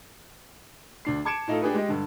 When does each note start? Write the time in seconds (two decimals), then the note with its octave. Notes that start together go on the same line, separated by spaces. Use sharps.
1.05 D2 D4 C7
1.25 A5 D6 G#6 C#7 D7 E7
1.48 A2 D#4 F4 A4
1.62 D4 G4 G#4 B4
1.74 G#3 G4 D#5
1.89 G2 D3